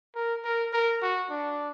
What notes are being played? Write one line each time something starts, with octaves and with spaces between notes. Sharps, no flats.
A#4
A#4
A#4
F#4
D4